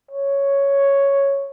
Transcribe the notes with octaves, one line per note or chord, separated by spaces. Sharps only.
C#5